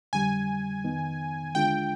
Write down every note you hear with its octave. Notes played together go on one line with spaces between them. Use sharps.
F2 D3 G3 G#5
F2 D#3 B3 D#4
D#2 D3 G#3 D4 F4 G5